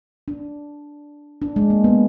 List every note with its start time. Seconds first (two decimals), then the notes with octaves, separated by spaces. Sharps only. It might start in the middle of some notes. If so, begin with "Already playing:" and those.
0.28 D4
1.42 D4
1.56 G#3
1.70 A#3
1.84 B3